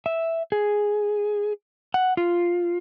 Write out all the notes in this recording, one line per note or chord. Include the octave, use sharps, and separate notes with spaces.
E5
G#4
F#5
F4